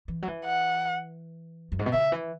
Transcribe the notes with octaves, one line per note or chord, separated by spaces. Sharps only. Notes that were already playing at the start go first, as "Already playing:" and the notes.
E3
F#3
E3
F#5
F#2
G#2
B2
C#3 E5
E3